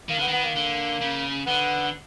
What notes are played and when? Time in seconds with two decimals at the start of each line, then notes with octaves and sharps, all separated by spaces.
0.09 D#3 A#3
0.18 D3 B3
0.27 D#3
0.32 B3
0.44 A#3
0.56 D3
1.01 C#3
1.46 D3 B3